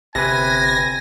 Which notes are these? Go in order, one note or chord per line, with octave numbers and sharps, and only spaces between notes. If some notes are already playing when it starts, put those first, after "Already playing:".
G1 C3 B4 G#5 A#6